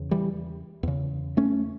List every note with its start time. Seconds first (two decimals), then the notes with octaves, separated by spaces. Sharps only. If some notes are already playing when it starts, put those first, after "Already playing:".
Already playing: E2 C#3
0.11 E3 G3
0.83 E2 C#3
1.37 A3 C#4